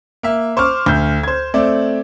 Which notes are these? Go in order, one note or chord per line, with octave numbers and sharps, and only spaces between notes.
A#3 E5
C5 C#6 D6 F6
D2 G6
C5 G#6
A3 C4 D5